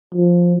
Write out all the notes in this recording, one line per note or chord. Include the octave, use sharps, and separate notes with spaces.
F3